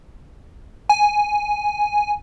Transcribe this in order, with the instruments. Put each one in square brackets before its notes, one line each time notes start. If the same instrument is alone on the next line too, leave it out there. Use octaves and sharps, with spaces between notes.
[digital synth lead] G#5